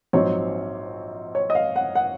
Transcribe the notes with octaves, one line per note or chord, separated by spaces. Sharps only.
A#1 G#2 F#3 C4 C#5
C#5
D#5
F5
F#5
F#5